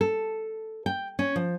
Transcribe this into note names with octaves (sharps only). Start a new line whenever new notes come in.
A4
G5
C#4
F3